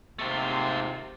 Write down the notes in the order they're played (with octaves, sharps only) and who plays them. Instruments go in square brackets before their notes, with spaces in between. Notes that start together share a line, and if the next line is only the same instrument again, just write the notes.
[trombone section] D#2 G#2 C3 [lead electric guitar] A3 F4